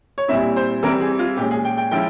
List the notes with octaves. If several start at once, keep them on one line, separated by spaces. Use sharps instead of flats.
C#5
A#2 G3 C4 E4 E5
C5
E3 G3 C4 A#4
G#4
F4
A#2 G#3 C#4 G4
G#4
G5
G5
F3 G#3 C#4 E4 G5